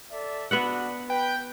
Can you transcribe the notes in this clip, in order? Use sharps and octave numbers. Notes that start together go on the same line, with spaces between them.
A4 D5 E5
B3 D4 F#4 E5 F#5
B4 G5